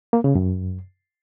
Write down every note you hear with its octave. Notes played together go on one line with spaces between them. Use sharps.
A#3
C#3
F#2